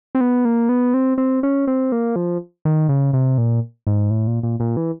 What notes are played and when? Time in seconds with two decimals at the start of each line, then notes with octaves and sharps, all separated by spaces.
0.15 C4
0.21 B3
0.45 A#3
0.69 B3
0.94 C4
1.18 C4
1.43 C#4
1.67 C4
1.92 A#3
2.16 F3
2.65 D#3
2.89 C#3
3.13 C3
3.38 A#2
3.87 G#2
4.11 A2
4.27 A#2
4.43 A#2
4.60 A#2
4.77 E3